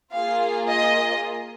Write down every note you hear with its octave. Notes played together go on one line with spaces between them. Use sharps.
A#3 F4 G#4 F5
D#5